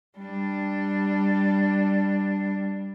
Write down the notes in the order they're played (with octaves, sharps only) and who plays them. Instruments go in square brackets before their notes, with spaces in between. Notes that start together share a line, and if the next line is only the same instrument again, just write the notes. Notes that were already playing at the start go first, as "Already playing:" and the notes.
[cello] G3 D4